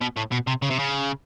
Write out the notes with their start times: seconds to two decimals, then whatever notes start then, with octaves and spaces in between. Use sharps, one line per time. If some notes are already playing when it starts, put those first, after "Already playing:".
0.01 B2
0.17 A2
0.32 B2
0.47 C3
0.62 C#3
0.70 C3
0.79 C#3